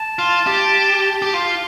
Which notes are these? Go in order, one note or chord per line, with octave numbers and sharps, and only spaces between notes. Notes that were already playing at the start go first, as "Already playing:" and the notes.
Already playing: A5
F4
G4
G4
F4